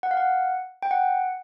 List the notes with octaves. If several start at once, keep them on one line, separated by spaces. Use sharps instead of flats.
F#5
F5
F#5
G5
F#5